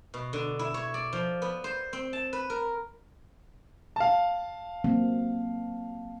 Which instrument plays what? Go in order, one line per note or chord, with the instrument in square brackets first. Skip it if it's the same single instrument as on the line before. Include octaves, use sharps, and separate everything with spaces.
[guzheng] B2
D3
E4
C#5
D5
F3
B3
C5
C4
A5
B4
A#4
[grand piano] F5 A5
[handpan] F#3 A#3 C4